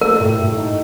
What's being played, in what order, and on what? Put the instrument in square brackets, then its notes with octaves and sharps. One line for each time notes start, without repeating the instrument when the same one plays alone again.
[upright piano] A3 [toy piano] A#4
[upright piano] A2
A2
D#4